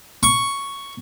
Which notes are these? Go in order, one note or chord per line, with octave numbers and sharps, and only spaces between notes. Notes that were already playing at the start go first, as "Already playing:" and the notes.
C#6